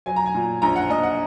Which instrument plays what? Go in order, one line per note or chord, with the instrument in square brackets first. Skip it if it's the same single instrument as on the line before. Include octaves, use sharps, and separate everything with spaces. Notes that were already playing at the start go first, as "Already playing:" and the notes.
[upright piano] F#3 G#5
A#5
G#5
A#2
A#1 A#5
F#5
A#1 D#5
F#5